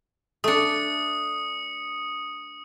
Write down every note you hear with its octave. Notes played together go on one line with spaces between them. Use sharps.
A3 D4 D#6 C#7